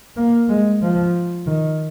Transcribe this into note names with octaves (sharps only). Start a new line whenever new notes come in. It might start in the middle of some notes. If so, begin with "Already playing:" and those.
A#3
G#3
F3
D#3